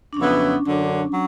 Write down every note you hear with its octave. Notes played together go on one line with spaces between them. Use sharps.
D4
F2 C#3 F#3 B3 C#4 E4
F#2 D3 F#3
F#3